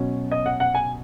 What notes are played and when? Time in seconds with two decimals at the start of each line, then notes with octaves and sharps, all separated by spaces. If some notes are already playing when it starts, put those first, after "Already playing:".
Already playing: B2 F#3 C#4
0.32 D#5
0.46 F#5
0.60 F#5
0.75 G#5